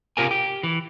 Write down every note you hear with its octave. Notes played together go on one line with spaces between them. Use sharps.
C3 F4 G4 A#4 C#5 G#5
G4
E3